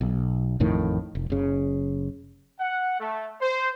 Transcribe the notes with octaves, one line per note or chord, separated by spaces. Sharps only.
B1
A1 F2 A2 D#3
F1
F#1 C#3
F#5
A3
C5